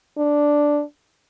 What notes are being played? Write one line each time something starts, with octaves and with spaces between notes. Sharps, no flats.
D4